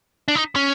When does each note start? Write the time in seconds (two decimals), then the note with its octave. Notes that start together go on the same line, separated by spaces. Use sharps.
0.28 D4
0.35 D#4
0.56 C#4